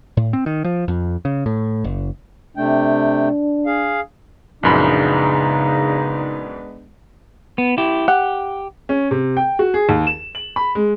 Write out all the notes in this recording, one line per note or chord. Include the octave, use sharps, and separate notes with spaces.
A2
C4
D#3
F3
F2
C#3
A2
F#1
C3 A3 D4 G5
G#4 F5
A#1 F#2 C#3 G#3 B3 D4 D#4 B5
B3
E4 G4
G4 F#5
C#4
C3
G5
F#4
G#4
D#2
E7
F#7
B5
G#3